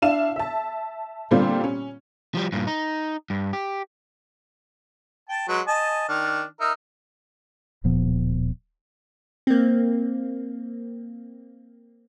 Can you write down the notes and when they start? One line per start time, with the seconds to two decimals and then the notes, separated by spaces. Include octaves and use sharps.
0.02 D4 E4 F5 E7
0.36 E5 A5
1.31 A#2 D3 G3 C4 F4 G4
1.64 C#4
2.35 F3 G3
2.53 G2 A#2
2.67 D#4
3.30 G2
3.53 G4
5.29 G5 A5
5.48 F#3 G#3 B4
5.67 D#5 G#5 A5
6.09 D#3 D4 F6
6.60 D#4 A#4 E5
7.84 D1 A#2 F3 B3
9.47 A#3 C4